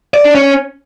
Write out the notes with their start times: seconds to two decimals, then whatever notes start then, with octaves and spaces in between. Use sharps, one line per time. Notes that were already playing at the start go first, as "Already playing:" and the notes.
0.14 D5
0.24 D4
0.35 C#4